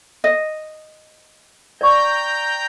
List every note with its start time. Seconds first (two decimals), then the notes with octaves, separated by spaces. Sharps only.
0.24 D#5
1.81 D5 G5 A#5 C#6 G6